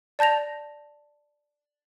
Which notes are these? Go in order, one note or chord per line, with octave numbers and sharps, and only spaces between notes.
D5 A5 G6 A#6 F7